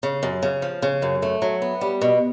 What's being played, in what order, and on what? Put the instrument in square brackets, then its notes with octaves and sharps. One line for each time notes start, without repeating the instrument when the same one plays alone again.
[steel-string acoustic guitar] C#3
F#2
C#3
F3
C#3
F#2
A3
F#3
B3
G3
B2